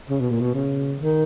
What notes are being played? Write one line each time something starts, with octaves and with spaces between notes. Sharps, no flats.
C#3
B2
A#2
B2
C#3
D#3